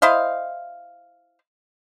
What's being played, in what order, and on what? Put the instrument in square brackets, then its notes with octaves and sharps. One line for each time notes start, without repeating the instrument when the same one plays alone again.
[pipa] E4 C5 D#5 F5